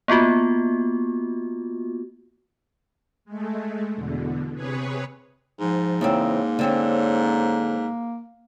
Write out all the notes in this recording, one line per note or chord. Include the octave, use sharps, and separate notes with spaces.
A#3 B3 F4 F#4
G#3 A3
E2 B2 D3
C3 G#4 B4 C#5
G#2 F3
E2 C#3 A#3 C4
D3 C4 C#4